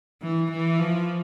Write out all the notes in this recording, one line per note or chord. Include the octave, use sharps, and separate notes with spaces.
E3
E3
F3